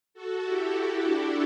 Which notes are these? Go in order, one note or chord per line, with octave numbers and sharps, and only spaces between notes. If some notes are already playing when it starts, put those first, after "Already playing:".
F#4 A4
E4 G4
E4 G4
D4 F#4